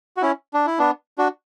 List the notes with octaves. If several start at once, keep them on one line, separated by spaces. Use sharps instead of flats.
F#4
C#4 E4
D4
E4
B3 D4
D4 F#4